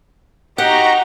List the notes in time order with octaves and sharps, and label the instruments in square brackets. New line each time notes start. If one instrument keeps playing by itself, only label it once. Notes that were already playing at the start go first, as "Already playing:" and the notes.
[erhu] D#4 [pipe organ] F#4 A#5 [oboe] G4 [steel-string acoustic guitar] F#5